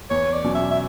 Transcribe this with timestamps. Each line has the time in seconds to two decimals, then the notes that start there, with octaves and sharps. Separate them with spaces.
0.10 E2 C#5
0.33 D5
0.44 B2 F#3 C#4
0.55 E5
0.71 E5